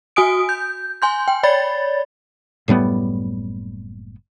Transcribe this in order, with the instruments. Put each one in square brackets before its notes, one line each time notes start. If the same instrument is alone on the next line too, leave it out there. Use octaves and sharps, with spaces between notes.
[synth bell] F#4 G#5 D#6 D7
G6
G#5 C6 G6
G5
C#5 D5 B5 A6
[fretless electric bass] F#1 A2 G3 B3